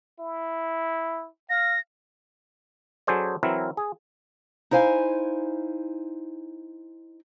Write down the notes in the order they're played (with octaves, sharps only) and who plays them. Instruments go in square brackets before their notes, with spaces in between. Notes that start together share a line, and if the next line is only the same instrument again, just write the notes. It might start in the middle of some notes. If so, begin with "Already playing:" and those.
[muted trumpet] E4
[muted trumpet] F5 [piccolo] A#6
[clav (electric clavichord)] F#3 C#4 G#4 A4 C5 D5
E3 F#3 C4 E4 A#4
G#4
[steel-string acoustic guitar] D#4 E4 C5 F5 G#5